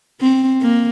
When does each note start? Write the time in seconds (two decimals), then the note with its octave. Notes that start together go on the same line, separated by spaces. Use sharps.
0.21 C4
0.61 A#3